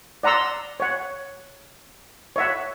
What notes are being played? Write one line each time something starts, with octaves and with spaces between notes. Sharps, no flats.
D5 F#5 A#5 C6 E6
C#5 F#5
C#5 E5 F#5